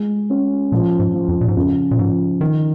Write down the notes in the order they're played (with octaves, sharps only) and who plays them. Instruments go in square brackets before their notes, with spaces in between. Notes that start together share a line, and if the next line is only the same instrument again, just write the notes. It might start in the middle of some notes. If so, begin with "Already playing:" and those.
Already playing: [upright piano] G#3
C#4
[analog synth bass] A#2 [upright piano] F3
[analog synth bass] G#2
[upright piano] F3
[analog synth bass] F2
A#2
G#2
[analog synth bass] F2 [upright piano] C#3
[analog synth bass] A#2
[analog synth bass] G#2 [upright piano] F3
[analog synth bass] D#3 [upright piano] D#4